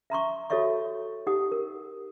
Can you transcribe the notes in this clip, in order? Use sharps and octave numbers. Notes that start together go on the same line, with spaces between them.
E5 A#5 C6 C#6
F#4 A4 C#5 D#5 E5 C#6
D#4 G4 F#5 D#6
A#4